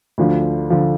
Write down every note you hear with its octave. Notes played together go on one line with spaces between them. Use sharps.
D2 D3 F3
D3 F3